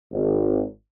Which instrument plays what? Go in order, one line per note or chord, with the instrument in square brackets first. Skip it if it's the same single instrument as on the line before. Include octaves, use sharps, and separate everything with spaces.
[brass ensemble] G#1